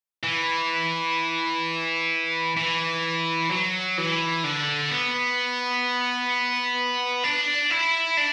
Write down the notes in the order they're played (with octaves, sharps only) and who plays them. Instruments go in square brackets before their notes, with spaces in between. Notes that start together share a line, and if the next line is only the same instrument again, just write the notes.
[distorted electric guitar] E3
E3
F#3
E3
D3
B3
D4
E4
D4